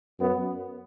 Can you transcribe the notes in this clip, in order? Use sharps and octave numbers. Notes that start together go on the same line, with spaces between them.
F#2 B3